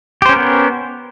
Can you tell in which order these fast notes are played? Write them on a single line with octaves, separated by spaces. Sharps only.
G4 C5 C#4 A#4 B3